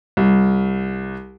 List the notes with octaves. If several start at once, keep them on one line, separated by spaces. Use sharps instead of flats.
C2